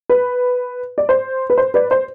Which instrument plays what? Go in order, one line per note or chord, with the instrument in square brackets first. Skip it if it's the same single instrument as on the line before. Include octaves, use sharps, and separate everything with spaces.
[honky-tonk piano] B4
D5
C5
B4
C5
B4 D5
C5